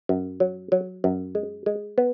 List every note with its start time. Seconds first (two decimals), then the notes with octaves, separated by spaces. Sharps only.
0.09 F#2
0.40 F#3
0.72 F#3
1.04 F#2
1.35 G#3
1.66 G#3
1.98 B3